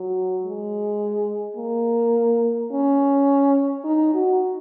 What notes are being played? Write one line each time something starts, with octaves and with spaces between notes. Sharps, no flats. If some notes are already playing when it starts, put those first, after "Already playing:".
Already playing: F#3
G#3
A#3
C#4
D#4
F#4